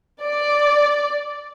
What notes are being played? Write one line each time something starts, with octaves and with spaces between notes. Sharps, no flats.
D5